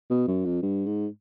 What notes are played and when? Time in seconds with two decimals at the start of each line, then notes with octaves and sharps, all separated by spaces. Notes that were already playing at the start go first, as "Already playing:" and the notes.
0.10 B2
0.27 F#2
0.45 F2
0.62 G2
0.86 G#2